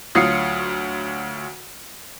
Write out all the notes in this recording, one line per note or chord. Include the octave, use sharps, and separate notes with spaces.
D2 F#3 F4 D#6 C7 C#7